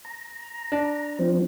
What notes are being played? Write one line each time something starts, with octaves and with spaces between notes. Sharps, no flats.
A#5
D4
F3 C4